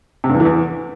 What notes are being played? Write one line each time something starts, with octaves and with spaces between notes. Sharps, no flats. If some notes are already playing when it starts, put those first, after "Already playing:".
C3
G2
E2
E3
E2